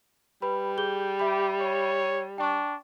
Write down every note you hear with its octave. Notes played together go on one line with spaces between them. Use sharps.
G3 B4 B5
G#4 G6 G7
G4 E5 B5
C#5
D4 G5 C#6